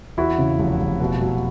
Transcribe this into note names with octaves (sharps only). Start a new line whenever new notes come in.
E2 E4 F#4
C#3
F1
F1
B2
F#3